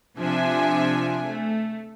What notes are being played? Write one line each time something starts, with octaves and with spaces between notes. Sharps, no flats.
C3 F3 D4 E5 G#5
A3